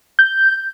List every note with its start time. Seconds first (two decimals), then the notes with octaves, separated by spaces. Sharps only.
0.19 G6